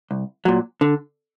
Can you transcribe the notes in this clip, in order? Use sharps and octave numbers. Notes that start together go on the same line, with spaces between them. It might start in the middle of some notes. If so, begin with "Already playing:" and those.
C2
A#2 F#3
D3